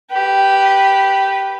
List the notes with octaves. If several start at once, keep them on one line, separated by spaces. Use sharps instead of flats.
G4 B4